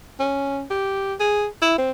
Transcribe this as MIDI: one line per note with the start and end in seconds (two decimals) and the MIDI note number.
0.20 0.65 61
0.70 1.14 67
1.20 1.46 68
1.62 1.76 64
1.78 1.91 60